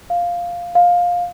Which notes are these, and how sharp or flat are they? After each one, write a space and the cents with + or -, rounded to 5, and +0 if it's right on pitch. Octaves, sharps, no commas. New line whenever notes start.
F5 +0
F5 +15